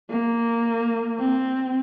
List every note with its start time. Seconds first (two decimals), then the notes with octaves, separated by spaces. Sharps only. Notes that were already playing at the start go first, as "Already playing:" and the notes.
0.11 A#3
1.20 C4